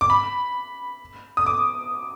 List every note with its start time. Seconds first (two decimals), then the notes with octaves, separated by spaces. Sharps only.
0.01 D6
0.10 B5
1.37 D#6
1.46 D6